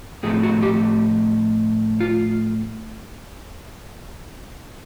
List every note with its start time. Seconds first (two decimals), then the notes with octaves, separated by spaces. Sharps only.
0.23 A2 F3 A3 C4 G#4
0.43 F#4
0.62 G4
2.01 F4